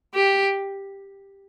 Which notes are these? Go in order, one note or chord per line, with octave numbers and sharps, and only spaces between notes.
G4